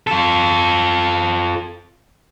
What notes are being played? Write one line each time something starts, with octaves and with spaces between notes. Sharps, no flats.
F4 A4